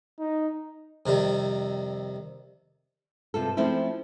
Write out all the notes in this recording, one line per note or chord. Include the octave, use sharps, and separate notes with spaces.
D#4
F2 C3 D#3 G3
G2 C3 F4 A4
F3 A3 C4 C#4 E4